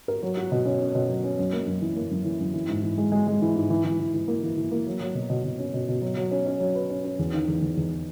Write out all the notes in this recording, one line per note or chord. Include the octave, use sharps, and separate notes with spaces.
A#4
F#3
F#4
B2
C#4
C#4
B2
F#3
C#4
F#2
A#3
F#2
E3
A#3
F#2
E3
F#2
E3
G#2
E3
G#3
G#3
G#3
E3
G#2
E3
E3
E3
E3
A#3
E3
E3
A#3
F#3
F#3
B2
B2
B2
C#4
B2
B2
F#3
F#3
C#4
C#4
F#3
B4
C#4
C#4
E2
D#3
E2
E2
E2